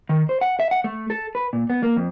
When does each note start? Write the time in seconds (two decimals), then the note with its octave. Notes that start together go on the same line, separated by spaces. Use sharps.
0.09 D#3
0.29 C5
0.41 F#5
0.60 E5
0.71 F#5
0.84 A3
1.10 A4
1.35 B4
1.53 A#2
1.70 B3
1.83 A#3
1.96 F2